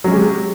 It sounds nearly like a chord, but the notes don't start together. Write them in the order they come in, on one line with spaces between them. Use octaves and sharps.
F#3 C#4 G#3 C3